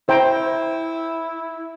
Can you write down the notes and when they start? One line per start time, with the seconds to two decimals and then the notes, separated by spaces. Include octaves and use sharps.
0.09 E4 C5 G5 A#5